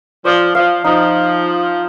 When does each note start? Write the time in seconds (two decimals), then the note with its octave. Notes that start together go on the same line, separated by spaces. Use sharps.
0.25 F3 D5
0.55 F3 F5
0.84 F3 D#4